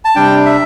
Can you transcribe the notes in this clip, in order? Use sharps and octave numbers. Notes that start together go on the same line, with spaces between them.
A5
C3 G3 D4 G5
E5